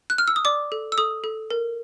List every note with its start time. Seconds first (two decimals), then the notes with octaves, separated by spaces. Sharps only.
0.10 F#6
0.18 F6
0.28 E6
0.36 D#6
0.45 D5 D6
0.72 A4
0.92 E6
0.98 A4 D#6
1.24 A4
1.51 A#4